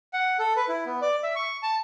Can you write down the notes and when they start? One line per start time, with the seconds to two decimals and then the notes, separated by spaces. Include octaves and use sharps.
0.13 F#5
0.39 A4
0.56 B4
0.68 E4
0.86 B3
1.02 D5
1.23 E5
1.35 C#6
1.63 A5